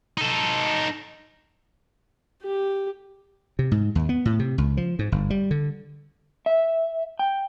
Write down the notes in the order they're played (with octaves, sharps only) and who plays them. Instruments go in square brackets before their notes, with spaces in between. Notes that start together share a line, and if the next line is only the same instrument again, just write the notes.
[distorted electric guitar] D#4 A4
[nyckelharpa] G4
[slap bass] C3
G#2
D#2
B3
A2
C3
C#2
F3
G#2
G1
G3
D3
[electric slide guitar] E5
G5